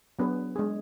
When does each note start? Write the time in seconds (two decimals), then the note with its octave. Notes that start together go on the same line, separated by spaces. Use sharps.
0.19 F#3 B3 D4 G#4 B4
0.56 G#3 D4 G#4